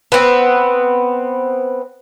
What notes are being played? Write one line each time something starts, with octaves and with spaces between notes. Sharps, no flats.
B3 C4